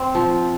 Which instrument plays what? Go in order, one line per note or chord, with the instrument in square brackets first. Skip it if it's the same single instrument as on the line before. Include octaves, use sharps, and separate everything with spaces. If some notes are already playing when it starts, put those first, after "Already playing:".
Already playing: [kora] C4
F3